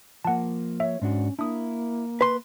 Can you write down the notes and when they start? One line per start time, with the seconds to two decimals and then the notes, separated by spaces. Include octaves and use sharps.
0.25 F3 A#3 F#5 A5
0.80 C#5 E5
1.02 G#2 C#4 D4 F#4
1.39 A#3 D4 E4 D#6
2.21 B4 C6